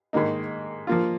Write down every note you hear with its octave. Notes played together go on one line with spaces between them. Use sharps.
G#2 D#3 A#3 D#4
F3 A#3 F4